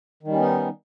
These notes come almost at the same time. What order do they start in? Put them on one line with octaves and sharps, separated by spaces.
D#3 G3 C#4 B3 D#4